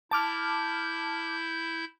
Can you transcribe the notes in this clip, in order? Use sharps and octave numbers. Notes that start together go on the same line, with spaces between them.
E4 A5 D6 F6 G6